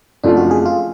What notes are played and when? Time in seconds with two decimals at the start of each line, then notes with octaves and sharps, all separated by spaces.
0.23 F#1 F2 F3 A3 D4 F4
0.37 F#4
0.51 G#4
0.66 F4